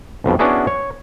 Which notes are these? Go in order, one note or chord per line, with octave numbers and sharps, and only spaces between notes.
B1 F2 B2
B3 C#4 D4 E4 F#4 G#4
C#5